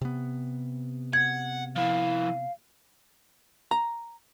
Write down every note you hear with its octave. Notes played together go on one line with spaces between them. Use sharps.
C3 B3
F#5 G#6
F3 E4 F5
A#5